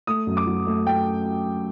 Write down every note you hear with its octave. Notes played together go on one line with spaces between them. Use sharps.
A3 D#6
F#2
D6
F#3
A3
A3 G5